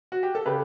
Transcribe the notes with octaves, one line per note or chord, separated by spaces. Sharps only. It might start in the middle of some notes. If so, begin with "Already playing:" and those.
F#4
G4
A4
C#3 G4 B4